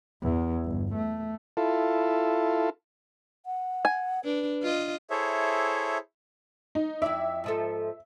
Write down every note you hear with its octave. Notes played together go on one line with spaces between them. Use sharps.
E2
G1
A3
E4 F4 A4
F#5
G#5
D4 B4
F4 D#5
E4 G#4 A4 C5 C#5 E5
D#4
F2 E4 D5 E5
G#2 F3 A4